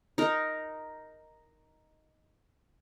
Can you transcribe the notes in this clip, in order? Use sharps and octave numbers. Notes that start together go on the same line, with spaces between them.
D#4 A#4